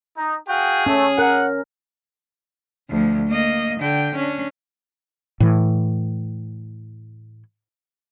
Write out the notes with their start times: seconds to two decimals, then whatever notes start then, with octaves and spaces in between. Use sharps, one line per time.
0.17 D#4
0.48 F#4 G#4 F5 G5
0.86 A3 C#4
1.18 A#4 F#5
2.90 D2 F3
3.28 A#3 D#5
3.81 D3 G5
4.16 C#4 D4
5.40 A2 E3